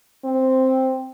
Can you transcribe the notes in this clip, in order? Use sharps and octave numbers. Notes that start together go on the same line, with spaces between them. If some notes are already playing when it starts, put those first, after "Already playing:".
C4